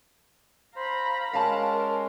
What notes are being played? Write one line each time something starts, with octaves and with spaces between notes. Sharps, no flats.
C5 F5 A#5 B5
G#3 C#4 A#4 F5 A5